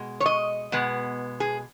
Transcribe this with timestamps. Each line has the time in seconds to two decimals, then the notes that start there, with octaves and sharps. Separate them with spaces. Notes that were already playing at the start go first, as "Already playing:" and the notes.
Already playing: B2 G#3
0.20 C#5
0.26 D#5
0.72 B2 G#3 B3
1.40 G#4